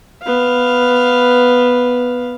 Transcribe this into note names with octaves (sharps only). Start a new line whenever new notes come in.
B3 F5